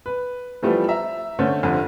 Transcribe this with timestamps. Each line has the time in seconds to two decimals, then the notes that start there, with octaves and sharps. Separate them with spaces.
0.06 B4
0.62 E3 F3 G3 A3 B3
0.89 E5 A#5
1.39 D3 A3 C#4 C5
1.63 F1 F2 D3